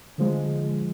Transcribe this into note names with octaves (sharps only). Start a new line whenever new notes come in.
D3 F3 G#3